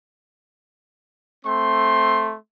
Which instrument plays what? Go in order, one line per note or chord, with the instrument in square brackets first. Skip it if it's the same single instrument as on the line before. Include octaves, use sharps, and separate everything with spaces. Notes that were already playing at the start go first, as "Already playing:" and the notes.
[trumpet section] A3 C4 C6